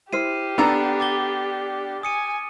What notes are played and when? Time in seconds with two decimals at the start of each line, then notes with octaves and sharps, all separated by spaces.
0.13 E4 G4 C5 F6 C7 D#7
0.58 B3 D4 A4 A#5
1.00 D6 A6 G7
2.03 G#5 D#6 C#7 D#7